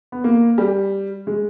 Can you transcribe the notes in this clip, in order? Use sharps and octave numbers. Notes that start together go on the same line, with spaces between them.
B3
A#3
G3
G#3